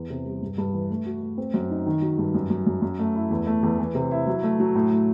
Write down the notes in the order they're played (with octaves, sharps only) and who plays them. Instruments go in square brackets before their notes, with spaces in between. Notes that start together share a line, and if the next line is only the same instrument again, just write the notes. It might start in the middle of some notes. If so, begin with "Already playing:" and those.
Already playing: [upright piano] E2
C3
G3
G2
G2
E3
A3
F#4
A3
C4
F#2
D#4
D#3
F#3
G2
F#2
F#2
F#2
F#2
A3
E4
E2
A3
E2
E3
C3
E4
F#3
A3
F#3
A2
A2